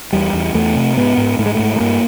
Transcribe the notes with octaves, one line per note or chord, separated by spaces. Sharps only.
E2 G3
E2
E2 A3
C3
G#2 B3
G#2
G#2 A3
G#3
G#2 A3
A3
G2 A#3